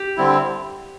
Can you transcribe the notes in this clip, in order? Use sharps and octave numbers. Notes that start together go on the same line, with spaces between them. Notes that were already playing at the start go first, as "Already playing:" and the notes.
Already playing: G4
D3 G3 C4 E4